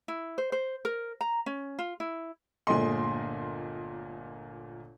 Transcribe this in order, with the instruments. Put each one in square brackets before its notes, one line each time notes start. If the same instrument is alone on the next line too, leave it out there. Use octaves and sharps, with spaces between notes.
[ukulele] E4
C5
C5
A#4
A#5
C#4
F4
E4
[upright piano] G1 A#2 G#3 A3 D#5 C6